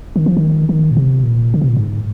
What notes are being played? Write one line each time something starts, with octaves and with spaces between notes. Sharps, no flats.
D#3
F3
D#3
D#3
A#2
C3
A#2
D3
C3
A#2
G#2